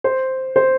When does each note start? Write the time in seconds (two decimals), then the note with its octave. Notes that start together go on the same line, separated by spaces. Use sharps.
0.04 C5
0.56 C5